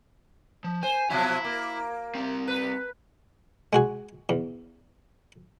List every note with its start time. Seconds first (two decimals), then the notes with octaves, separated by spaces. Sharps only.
0.64 F3
0.83 C5 G#5
1.10 B2 F3 F#3 E4
1.45 A#3
2.15 G3 C4
2.48 B4
3.73 G#3 F#4 G#4
4.29 E2